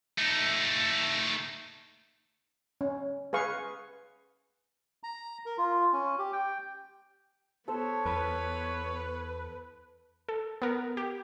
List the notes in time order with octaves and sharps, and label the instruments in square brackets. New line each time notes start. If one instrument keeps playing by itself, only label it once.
[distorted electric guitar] A3 D#4
[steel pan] C#4
G#4 B4 F5 C#6
[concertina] A#5
A#4
F4
C#4
G4
G5
[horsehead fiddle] B3 C#5 [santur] A4 C5
[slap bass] E2 [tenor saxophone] B4
[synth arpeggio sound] A4
B3 A#4
G4